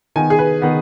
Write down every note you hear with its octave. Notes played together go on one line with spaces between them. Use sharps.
D#3 B3 G#5
G#4
B4
D#3 B3